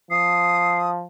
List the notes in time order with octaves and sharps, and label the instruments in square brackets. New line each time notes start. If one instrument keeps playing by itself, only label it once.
[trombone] F3 [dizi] D#6 [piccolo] C7